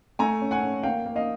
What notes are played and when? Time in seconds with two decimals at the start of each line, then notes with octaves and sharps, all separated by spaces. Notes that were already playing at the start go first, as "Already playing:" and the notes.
0.19 A3 G#5 A#5
0.41 C#4
0.51 F#5 G#5
0.62 C#4
0.83 A#3 F5 G5
1.06 A#3
1.16 D#5 F5